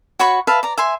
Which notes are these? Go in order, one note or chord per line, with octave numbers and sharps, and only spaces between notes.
F#4 C#5 B5 C#6
B4 E5 F5 A5
D5 A#5
E5 G#5 C6